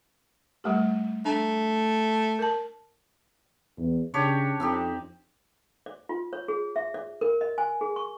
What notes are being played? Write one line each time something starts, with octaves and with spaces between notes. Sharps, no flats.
G3 A3 G4
A3 D4
A#4 A5
E2
C#3 D4 G4 C#5
F2 C4 D#4 G4
D5
F4
C#5
G#4
E5
D5
A#4
D#5
G#5
G#4
C#6